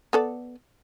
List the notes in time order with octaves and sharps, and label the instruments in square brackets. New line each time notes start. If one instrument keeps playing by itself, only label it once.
[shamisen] B3 A4 D5